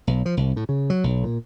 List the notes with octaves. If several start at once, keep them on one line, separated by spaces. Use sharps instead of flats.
B1
F3
C2
A2
C#3
F#3
B1
A#2